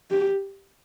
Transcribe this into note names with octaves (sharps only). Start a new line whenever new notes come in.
G4